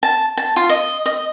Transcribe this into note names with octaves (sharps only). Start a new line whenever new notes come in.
A5
A5
F4
D#5
D#5